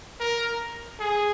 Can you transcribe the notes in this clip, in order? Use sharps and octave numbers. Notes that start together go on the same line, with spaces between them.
A#4
G#4